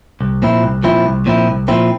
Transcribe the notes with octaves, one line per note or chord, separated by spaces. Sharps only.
C2
A#2 F3 C4 E4
C2
A#2 F3 C4 E4
C2
A#2 F3 C4 E4
C2
A#2 F3 C4 E4